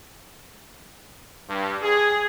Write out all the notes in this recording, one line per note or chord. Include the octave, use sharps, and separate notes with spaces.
G2
G#4